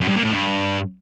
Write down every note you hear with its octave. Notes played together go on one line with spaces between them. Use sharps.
F#2
G2
A#2
A2
G2